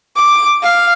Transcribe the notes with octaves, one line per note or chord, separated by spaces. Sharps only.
D6
F5